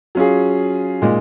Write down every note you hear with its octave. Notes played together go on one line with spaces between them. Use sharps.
F#3 C#4 F4 G#4
A#2 G#3 D#4